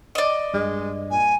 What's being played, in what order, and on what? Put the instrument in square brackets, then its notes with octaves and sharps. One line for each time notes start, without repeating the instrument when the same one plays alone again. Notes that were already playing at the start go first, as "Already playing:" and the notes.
[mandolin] D5 D#5
[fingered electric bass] G2 [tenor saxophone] G#3
[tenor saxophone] A#2 [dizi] G#5